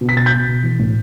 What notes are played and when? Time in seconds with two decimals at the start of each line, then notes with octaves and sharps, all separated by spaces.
0.01 B2
0.09 B6
0.16 B2 A6
0.26 G6 B6
0.32 B2
0.48 B2
0.63 E3
0.79 A2